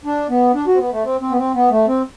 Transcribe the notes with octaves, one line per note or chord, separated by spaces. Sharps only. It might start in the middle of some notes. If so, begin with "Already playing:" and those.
D4
B3
D4
F#4
C4
B3
A3
C4
C4
B3
C4
B3
A3
C4